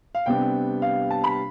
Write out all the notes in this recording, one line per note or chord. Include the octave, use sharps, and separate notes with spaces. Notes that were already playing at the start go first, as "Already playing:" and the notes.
F5
C3 G3 B3 D4 G5
F5
A5
B5